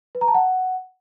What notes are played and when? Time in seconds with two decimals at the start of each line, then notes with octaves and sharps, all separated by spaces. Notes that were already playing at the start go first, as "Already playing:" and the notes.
0.15 B4
0.21 A#5
0.28 A5
0.34 F#5